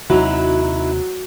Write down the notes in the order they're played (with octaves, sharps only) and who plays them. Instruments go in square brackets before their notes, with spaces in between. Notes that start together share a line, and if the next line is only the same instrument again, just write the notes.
[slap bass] D#2 C3 [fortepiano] F#3 [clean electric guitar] D#4 E4 [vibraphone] F#4